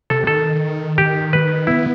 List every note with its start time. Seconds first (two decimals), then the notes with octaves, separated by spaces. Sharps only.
0.10 C3 A4
0.27 D#3 A4
0.98 G4
1.33 B4
1.67 B3 E4